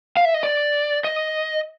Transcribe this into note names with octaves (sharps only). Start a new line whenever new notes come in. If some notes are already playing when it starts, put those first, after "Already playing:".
F5
E5
D#5
D5
D#5